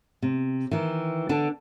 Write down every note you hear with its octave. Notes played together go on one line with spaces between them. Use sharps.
C3
D#3 E3
D3 D4 A5